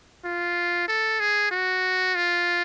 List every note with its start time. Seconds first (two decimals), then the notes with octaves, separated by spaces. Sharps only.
0.25 F4
0.88 A4
1.20 G#4
1.51 F#4
2.15 F4